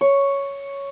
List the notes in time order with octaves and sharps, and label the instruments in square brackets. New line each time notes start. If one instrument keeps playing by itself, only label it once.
[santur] C#5